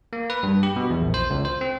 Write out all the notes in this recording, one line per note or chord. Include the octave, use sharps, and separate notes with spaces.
A#3
B4
G2
G4
B2
E2
A#1
C5
C#2
C5
C4